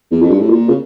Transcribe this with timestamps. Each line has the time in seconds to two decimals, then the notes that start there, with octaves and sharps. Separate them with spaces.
0.11 E2
0.22 F2
0.30 G2
0.40 A2
0.49 A#2
0.68 C#3